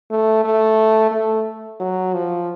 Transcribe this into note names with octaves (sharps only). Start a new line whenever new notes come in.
A3
A3
A3
F#3
F3